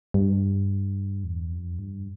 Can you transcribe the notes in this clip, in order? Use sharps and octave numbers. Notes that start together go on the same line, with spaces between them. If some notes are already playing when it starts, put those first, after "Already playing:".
G2
E2
F2
G2